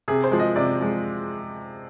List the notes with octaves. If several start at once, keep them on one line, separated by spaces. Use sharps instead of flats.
C3 G#4
C5
F3 G#3
D#5
C3 D5
F3 G#3